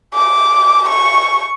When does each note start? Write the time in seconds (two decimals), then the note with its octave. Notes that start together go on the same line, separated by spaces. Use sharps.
0.14 D6
0.89 C#6